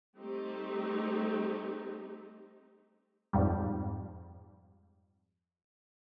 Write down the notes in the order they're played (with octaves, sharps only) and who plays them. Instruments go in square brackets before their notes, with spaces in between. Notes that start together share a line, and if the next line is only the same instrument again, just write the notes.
[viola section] G3 A3 C4 D#4 G4
[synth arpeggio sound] F2 G#2 G3